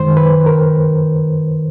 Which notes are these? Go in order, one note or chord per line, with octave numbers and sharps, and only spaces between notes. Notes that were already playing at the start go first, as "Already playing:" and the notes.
Already playing: F#2 D#3 G#3 C5
B4
A#4